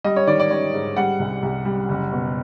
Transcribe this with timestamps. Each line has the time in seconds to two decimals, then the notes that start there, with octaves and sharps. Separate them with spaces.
0.04 G3 D#5
0.16 C#5
0.27 D#3 D5
0.40 D5
0.51 G3 C#5
0.73 G#2
0.96 G3 F#5
1.19 C2
1.42 C2
1.65 G3
1.89 F#1
2.12 B2